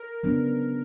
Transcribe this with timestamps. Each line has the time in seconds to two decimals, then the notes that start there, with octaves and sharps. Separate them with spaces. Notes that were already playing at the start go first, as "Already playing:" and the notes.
Already playing: A#4
0.23 C#3 F#3 B3 D4